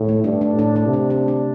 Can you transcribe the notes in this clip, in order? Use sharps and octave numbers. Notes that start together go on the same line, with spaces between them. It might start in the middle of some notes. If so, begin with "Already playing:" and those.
Already playing: A2
A3
G2 D4
D4
A2 D4
D4
C3
D4
D4
D4